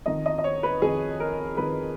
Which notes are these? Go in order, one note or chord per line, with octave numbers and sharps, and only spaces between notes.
F2 D#3 D#5
D#5
D#5
C#5
B4
F2 D#3 G#4
A#4
F2 D#3 B4